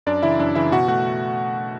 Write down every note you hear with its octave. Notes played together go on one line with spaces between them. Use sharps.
F#2 D4 D5
C#3 E3 E4 E5
F#2 D4 D5
C#3 E3 E4 E5
B2 F#4 F#5
A3 F#4 F#5